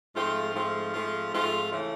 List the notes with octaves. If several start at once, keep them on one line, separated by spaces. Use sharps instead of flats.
G#2 F3 A3 C4 F4
G#2 F3 A3 C4 F4
G#2 F3 A3 C4 F4
G#2 F3 A3 C4 F4
C#3 E3 A3